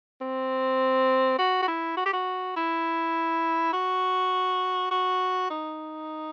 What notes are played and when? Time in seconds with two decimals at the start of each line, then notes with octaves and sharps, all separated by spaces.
0.21 C4
1.39 F#4
1.62 F#4
1.68 E4
1.97 F#4
2.06 G4
2.13 F#4
2.56 E4
3.73 F#4
4.91 F#4
5.50 D#4